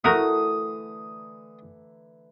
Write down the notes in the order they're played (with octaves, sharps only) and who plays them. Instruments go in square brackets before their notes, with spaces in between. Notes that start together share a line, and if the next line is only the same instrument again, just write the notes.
[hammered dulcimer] D3 E3 A#5 [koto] A3 F#4 A#4 [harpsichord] D#6